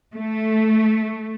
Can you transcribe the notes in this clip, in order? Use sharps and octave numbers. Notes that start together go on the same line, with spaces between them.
A3